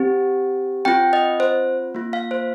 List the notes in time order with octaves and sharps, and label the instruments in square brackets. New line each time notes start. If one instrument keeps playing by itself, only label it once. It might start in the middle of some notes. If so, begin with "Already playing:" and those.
Already playing: [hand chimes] C4 G4
C4 F4 G5
D#5
C5
A#3 F4
F5
C5